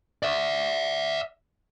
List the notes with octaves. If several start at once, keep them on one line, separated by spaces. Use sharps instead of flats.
D5 E5